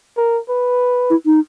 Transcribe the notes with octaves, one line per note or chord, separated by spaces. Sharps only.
A#4
B4
E4
D#4